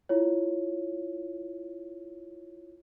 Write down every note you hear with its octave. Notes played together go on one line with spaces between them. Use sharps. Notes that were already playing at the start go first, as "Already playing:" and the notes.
E4 F4 C#5